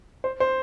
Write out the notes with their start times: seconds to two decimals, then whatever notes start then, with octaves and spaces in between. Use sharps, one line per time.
0.24 C5
0.40 C5